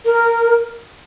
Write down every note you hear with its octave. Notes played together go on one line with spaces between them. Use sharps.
A#4